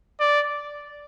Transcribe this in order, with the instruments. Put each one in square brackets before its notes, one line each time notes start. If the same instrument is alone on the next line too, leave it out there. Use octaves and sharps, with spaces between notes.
[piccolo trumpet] D5